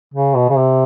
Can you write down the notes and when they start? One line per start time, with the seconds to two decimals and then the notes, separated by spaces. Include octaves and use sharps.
0.14 C#3
0.35 B2
0.50 C#3
0.56 C3